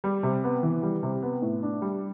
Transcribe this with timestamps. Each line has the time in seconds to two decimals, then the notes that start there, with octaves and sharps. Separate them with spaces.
0.04 G3
0.23 C3
0.44 B3
0.63 E3
0.83 G3
1.03 C3
1.23 B3
1.42 A2
1.63 D4
1.82 G3